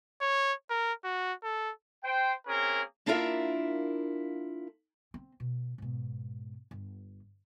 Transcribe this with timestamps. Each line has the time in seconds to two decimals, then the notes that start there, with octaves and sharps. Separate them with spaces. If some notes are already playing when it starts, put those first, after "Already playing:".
0.21 C#5
0.70 A#4
1.04 F#4
1.43 A4
2.04 C5 G5
2.47 A#3 C4 C#4 G#4 A#4
3.06 A#3 D4 E4 F4 A#4 E5
5.14 C4
5.40 B2
5.78 G#2 B2
6.71 G1